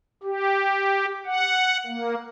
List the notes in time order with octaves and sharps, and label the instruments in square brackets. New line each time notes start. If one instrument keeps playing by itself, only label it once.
[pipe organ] G4
F#5
A#3